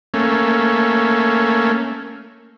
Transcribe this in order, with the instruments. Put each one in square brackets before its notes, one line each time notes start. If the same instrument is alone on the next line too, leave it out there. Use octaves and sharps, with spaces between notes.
[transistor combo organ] A3 A#3 C#4